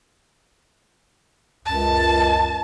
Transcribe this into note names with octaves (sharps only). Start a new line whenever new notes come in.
C#2 F#2 A5